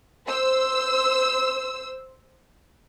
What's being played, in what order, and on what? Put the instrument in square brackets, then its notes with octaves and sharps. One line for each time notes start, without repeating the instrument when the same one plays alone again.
[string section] C5 E6